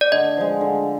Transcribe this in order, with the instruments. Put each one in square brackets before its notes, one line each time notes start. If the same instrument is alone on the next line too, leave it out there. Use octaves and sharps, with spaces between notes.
[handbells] D5
[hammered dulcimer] D3 [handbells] D#5
[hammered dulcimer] F3 G#3
D3